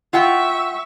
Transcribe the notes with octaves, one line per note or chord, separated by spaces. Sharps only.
F4 E5 F#5 G5 C#6